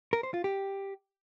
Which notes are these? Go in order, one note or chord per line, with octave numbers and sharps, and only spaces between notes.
A#4
C5
F4
G4